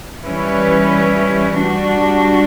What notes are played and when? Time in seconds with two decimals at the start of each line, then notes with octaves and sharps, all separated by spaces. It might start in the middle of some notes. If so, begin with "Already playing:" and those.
0.23 E3 G3 C#4 E4 B4
1.58 G3 D4 F#4